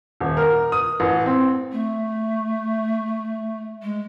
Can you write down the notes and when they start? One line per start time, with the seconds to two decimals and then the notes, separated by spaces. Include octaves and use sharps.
0.20 D#1
0.37 A#4
0.72 D#6
1.00 A1
1.26 C4
1.72 A3
3.82 G#3